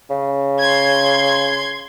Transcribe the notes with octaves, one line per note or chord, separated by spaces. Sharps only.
C#3
C6 G#6